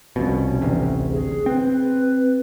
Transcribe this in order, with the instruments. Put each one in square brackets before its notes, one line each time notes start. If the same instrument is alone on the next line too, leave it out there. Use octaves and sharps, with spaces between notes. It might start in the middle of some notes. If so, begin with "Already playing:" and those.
[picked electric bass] C2 F2 B2 [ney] C#4
[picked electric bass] A1 D2 C3
[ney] G#4
[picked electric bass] C4 [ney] B4